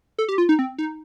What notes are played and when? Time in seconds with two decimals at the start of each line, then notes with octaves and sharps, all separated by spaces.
0.19 A4
0.29 G4
0.38 F4
0.49 D#4
0.59 C4
0.78 D#4